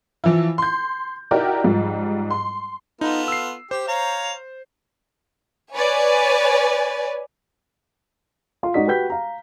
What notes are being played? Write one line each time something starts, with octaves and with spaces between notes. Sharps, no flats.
E3 F3 E4
C6 G6
D#4 E4 F#4 G4 A#4 D5
G#2 F3 G3
C6
B3 D#4 F4 A4
E6 C7
G4 C5
C#5 F5 A#5
B4 C#5 D5 G#5
F4 F5 C6
G#2 D#4 F#4 D5 D#5 B6
F#4 G4 B4 G5 G6 B6
F5 A#5